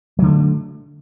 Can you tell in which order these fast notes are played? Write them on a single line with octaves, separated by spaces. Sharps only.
F#3 D3 A3